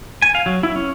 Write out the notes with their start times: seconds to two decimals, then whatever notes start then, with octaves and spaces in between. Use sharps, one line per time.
0.22 G#5
0.35 F5
0.46 F#3
0.63 E4
0.76 C#4